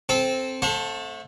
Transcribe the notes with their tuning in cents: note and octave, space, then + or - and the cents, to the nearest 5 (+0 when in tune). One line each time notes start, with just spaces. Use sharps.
C4 +0 A4 -20
A3 +0 C5 +30 F#5 -35